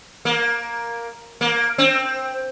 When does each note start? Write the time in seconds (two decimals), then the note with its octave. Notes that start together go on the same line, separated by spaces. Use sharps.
0.25 A#3
1.41 A#3
1.78 C4